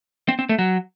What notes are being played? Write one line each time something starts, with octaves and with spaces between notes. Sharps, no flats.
C4
C4
A3
F#3